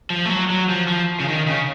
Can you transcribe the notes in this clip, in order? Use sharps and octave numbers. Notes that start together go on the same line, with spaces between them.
F3
A3
F#3
F#3
F3
F3
C#3
D#3
C#3